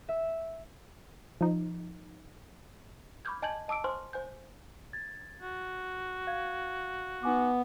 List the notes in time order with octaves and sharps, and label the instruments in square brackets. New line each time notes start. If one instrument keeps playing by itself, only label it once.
[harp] E5
[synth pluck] F3 D#4
[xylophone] B5 C#6 D6 F6 G6 G#6
D#5 G#5 A5 G6 G#6 F#7
D#5 A5 D6 E6 D7
C5 G#5 C6 C#6 F6
C5 G#5 G6
[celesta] G#6 A6
[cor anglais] F#4
[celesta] F5 G#6
[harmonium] B3 [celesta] D#4 G#5 D6